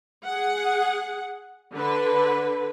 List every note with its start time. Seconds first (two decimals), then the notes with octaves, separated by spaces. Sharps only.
0.25 G#4 F#5
1.73 D3 B4